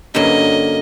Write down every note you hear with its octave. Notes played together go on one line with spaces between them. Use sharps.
G2 D3 F#3 A#3 C#4 D#5